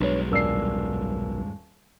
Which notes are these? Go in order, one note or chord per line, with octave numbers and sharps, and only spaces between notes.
B1 G2 G#3 D4 B4 C#5
D#1 D4 A#4 E6 C7